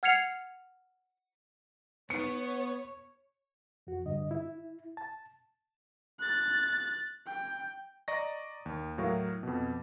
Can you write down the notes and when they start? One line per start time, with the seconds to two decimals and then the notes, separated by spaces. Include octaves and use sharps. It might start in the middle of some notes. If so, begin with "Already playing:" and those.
0.03 F#5 F6 G#6 C7 C#7 F7
2.10 B3 C#5 C#7
3.87 F2 F#4
4.06 G2 D3 D#5
4.31 E4
4.97 A5
6.19 F#6 A6
7.27 G5
8.08 D5 D#5 A#5 C#6 A#6
8.66 D#2
8.98 A2 F#3 A#4 F5 C#6
9.43 F2 B2